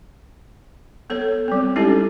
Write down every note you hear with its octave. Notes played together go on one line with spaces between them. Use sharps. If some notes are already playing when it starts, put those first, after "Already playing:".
B3 A4 C#5
G3 C4
G#3 C#4 D#4 E4 G4 A4